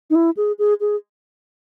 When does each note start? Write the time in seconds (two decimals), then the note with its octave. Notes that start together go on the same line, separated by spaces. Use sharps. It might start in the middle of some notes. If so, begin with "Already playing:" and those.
0.10 D#4
0.15 E4
0.37 G#4
0.59 G#4
0.80 G#4